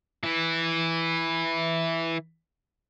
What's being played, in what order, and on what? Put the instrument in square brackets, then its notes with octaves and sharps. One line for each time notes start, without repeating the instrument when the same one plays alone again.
[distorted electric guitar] E3 E4